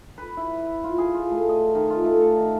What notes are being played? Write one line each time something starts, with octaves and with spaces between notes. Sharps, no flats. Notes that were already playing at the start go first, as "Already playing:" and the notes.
B4
E4
F4
G#4
F4
A3
D#5
D#3
F4
A3
A4
D#3